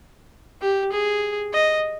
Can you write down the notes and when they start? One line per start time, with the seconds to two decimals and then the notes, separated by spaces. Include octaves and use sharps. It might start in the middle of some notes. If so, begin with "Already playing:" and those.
0.61 G4
0.92 G#4
1.54 D#5